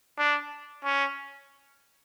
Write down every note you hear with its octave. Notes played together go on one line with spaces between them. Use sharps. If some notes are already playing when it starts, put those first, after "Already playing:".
D4
C#4